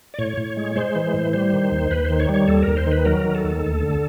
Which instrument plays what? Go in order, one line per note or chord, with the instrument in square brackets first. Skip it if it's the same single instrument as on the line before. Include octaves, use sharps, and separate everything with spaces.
[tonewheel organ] D5
A2 C#5
A2
G#3
G#3 C5
E3
A2
G3 C5
D#3
D#2
D#2 B4
C5
D#3
C#5
G3
C#5
D#2 A4
D#2 A#4
C5
D#3 B4
F#3 A#4
D#3
A4
D#2
D2
D3